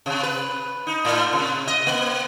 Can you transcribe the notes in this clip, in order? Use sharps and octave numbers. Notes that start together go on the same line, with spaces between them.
C3
B4
D#4
A2
C3
D#5
A#3